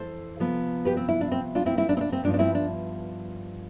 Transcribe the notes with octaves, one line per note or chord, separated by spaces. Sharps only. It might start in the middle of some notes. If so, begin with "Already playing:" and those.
Already playing: F2 E3 A4 C5
C3 F3 B3
G4 B4
C4
E4
D4
C4
D4 F4
C4 E4
C4 E4
D4
C4
D4
C4
G2 F3 B3 D4
D4
C4 E4
D4